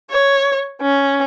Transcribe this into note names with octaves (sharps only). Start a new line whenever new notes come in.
C#5
C#4